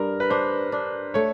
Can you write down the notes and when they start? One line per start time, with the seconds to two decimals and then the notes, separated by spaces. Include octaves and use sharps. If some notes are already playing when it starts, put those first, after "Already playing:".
Already playing: G2 A#4
0.20 B4
0.30 D4 C5
0.72 D4
1.14 A3 C#5